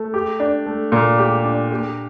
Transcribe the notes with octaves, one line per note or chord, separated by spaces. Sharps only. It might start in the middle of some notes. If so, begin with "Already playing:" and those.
Already playing: A3
G4
D4
A3
A#2
G4
D4
G4